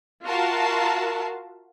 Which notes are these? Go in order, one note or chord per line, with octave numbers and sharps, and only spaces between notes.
F4 F#4 A#4 E5 F5 A5